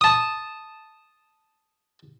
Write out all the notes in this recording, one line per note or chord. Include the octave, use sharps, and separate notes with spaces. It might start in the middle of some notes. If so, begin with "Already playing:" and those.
A5 D#6